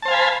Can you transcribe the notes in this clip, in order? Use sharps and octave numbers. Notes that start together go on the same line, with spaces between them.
C5 F5 G#5 A5 B5